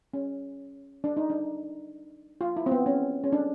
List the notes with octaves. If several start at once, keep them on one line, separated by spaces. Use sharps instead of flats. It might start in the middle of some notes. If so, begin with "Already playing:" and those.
C#4
D4
D#4
D4
F4
E4
C4
B3
C#4
C#4
D4